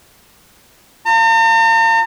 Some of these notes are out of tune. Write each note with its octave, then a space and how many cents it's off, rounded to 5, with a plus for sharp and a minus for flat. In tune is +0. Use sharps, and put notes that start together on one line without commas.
F4 +0 A#5 -45